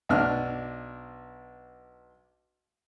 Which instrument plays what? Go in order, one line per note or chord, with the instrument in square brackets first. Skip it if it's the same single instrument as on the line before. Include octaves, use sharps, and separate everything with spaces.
[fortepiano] B1 D4 F6